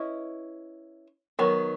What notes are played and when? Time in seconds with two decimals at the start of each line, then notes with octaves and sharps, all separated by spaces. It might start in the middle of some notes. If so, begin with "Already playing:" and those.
Already playing: C#4 E4 B4 D#5
1.39 D#3 F#3 B3